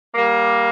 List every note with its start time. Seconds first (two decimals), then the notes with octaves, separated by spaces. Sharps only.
0.15 G3 A#3